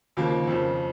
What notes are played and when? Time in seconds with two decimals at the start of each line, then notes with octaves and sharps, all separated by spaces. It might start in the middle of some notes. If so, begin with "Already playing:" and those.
0.17 D#2 C#3 F3 A#3 F4
0.47 F2 C#3 F3